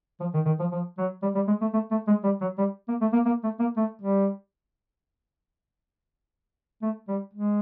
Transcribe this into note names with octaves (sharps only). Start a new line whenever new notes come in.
F3
D#3
D#3
F3
F3
F#3
G3
G3
G#3
A3
A3
A3
G#3
G3
F#3
G3
A#3
A3
A#3
A#3
A3
A#3
A3
G3
A3
G3
G#3